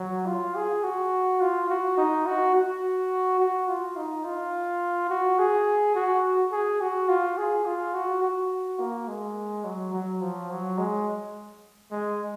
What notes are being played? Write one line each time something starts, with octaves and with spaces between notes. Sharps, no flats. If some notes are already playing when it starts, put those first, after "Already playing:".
Already playing: F#3
F4
G#4
F#4
F4
F#4
D#4
F#4
F#4
F#4
F4
D#4
F4
F#4
G#4
F#4
G#4
F#4
F4
G#4
F4
F#4
F#4
A#3
G#3
F#3
F#3
F3
F#3
G#3
G#3